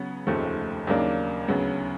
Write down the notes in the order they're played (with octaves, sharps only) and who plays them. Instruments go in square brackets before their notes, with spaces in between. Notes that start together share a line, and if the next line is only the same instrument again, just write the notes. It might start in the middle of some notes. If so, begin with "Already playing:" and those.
Already playing: [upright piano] C#3 F#3 B3
F1 D#2 C#3 F3 A3
D#2 C#3 F#3 A#3 D4
D2 C#3 F#3 B3